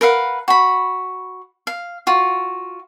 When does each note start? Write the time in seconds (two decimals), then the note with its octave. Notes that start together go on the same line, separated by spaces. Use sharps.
0.01 A#4 B4 F5 F#5
0.48 F#4 B5
1.67 F5
2.07 F4 F#4